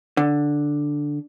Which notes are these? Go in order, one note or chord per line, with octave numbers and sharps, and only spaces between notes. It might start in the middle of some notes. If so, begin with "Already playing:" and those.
D3